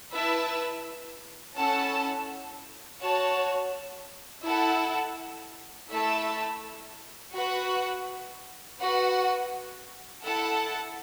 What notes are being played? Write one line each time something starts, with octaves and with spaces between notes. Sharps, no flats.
E4 B4 E5 A5
C#4 E4 A4 F#5 A5
F#4 C#5 A5
E4 A4 F#5 A5
A3 E4 A4 E5 A5
F#4 B4 F#5
F#4 B4 F#5
E4 A4 F#5 A5